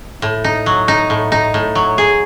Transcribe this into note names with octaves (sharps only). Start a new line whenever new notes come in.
A2
D#4
F#3
D#4
A2
D#4
A2
F#3
G#4